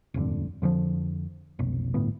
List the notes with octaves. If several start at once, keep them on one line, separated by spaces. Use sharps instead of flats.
D#1 G#1 F2 D3
F2 D3 D#3 F3
F1 B1
G1 D2 A2 B3